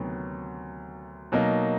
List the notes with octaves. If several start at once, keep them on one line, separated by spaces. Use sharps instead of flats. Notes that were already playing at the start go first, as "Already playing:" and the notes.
Already playing: D2 C3 D#3 F#3 B3
B2 F#3 A#3 D#4